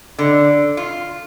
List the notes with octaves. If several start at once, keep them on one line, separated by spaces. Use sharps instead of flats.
D3
F4